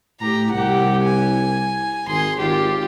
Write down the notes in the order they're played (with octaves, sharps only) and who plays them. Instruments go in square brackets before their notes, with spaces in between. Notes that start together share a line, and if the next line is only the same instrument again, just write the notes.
[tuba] A2 [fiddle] G4 A#5
[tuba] C2 [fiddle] G4 F#5
[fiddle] G#5
[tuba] G#1 [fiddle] G#4 C6
[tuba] G#1 [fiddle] F4 G4